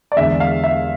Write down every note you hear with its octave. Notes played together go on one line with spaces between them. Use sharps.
D5
E2 D3 G#3 E5
F5
E5